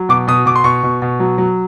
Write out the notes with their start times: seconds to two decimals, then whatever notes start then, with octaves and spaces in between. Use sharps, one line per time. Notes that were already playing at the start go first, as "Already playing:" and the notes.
Already playing: F#3
0.09 B2 D6
0.28 B2 D#6
0.46 B2 D6
0.56 C6
0.64 B2 C#6
0.83 B2
1.02 B2
1.20 F#3
1.38 F#3